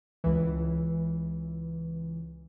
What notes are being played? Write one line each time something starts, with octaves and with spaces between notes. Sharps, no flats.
C#2 E3